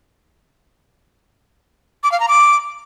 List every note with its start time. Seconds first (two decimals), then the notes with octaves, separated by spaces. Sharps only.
2.03 D6
2.12 F5
2.20 A#5
2.28 D6